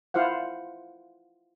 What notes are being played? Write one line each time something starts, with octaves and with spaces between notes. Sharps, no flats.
E4 F4 C5 F5 F#5